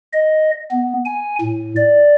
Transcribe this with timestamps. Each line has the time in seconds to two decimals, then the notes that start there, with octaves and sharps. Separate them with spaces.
0.13 D#5
0.71 B3
1.05 G#5
1.41 A2
1.76 D5